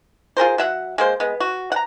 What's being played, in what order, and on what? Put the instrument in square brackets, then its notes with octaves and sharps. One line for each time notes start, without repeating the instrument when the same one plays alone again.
[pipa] F4 G#4 A#4 C5
F#3 E5 F#5
G#3 A#3 C5
G#3 B3
F#4
F#5 A#5